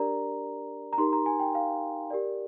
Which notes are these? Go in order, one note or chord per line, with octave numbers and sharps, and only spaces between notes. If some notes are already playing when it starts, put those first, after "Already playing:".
Already playing: D4 G4 A#4 D5 A#5
A#5
D#4 G4 A#4 C6
A#5
G#5
G5
F5
G4 A#4 D5